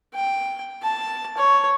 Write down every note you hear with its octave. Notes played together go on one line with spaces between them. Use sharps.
G5
A5
C#5